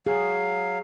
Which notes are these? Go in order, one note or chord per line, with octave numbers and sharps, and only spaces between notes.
F#3 G#4 F5